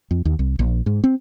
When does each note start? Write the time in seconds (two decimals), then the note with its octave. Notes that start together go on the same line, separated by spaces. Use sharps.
0.11 F2
0.25 D#2
0.39 C2
0.59 A#1
0.86 G#2
1.04 C4